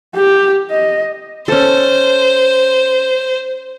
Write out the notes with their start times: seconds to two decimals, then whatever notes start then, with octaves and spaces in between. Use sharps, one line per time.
0.15 G4
0.71 D#5
1.48 C#4 A4 C5